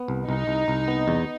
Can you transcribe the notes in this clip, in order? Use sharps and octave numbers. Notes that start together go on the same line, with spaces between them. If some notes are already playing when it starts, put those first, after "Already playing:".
Already playing: B3
C2
C2 D#4
C2
C2
B3
E2